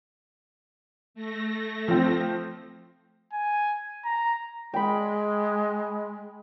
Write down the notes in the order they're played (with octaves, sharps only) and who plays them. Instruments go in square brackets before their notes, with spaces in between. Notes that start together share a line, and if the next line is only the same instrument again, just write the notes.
[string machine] A3 A#6
[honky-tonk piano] F3 C4
[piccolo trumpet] G#5
A#5
[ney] G#3 [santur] G5 B5